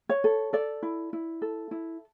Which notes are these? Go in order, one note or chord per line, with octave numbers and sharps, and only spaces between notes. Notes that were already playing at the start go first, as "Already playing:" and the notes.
C#5
A4
A4 D5
E4
E4
A4
E4